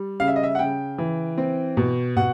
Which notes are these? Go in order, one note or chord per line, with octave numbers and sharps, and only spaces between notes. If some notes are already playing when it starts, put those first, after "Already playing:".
Already playing: G3
C#3 F5
E5
D#5
E5
F#5
C#3 G5
E3
C4
B2
B2 F#5